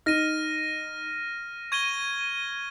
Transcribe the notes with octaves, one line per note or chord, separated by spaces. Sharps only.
D#4 F6 A#6 D#7
C#6 G#6 D#7 G7